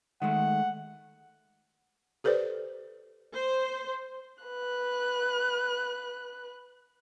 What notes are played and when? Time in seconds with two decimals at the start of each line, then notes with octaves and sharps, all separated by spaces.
0.22 D#3 G#3 A3 F#5
2.24 G4 A4 B4 C5 D5
3.35 C5
4.44 B4 F#6